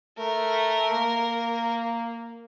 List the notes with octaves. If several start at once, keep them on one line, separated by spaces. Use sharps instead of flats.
A3 A#4
A#3